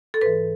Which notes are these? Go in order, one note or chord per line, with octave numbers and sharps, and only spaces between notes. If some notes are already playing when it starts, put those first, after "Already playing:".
A4
G#2 E3 B4